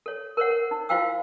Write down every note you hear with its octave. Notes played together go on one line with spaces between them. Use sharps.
A4 C#5
A#4 C5 C#5 F#5
A#4
D#4
E4 F4 C5 F5 G5 E6